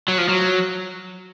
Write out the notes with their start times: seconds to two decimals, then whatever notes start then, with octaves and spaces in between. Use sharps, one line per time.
0.08 F#3
0.18 F3
0.28 F#3